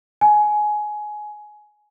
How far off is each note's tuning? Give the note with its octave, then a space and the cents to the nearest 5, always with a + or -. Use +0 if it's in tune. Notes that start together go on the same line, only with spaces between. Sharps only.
G#5 +20